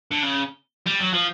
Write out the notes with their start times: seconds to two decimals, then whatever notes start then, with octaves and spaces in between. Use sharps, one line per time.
0.11 D3
0.23 C#3
0.86 G3
1.00 F#3
1.13 F3